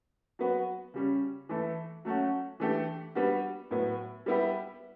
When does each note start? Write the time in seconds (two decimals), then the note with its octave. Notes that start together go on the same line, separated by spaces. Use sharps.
0.39 F#3 B3 F#4
0.94 C#3 G3 C#4
1.49 E3 A3 E4
2.05 F#3 A3 C#4 F#4
2.60 E3 A3 D4 G4
3.15 G3 B3 D4 F#4
3.71 A2 F#3 B3
4.26 G3 B3 E4 G4